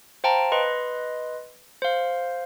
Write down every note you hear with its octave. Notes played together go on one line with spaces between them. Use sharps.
C5 F5 G5 A5 A#5
B4 D#5 C6
C5 F5